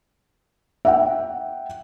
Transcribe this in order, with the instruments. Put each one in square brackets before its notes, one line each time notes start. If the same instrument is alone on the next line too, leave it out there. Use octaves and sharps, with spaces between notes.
[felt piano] E5 F#5 G5